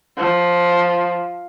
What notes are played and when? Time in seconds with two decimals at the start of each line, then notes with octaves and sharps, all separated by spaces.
0.17 F3